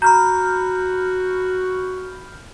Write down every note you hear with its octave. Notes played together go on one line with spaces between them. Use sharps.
F#4 A#5 B5 F6 G6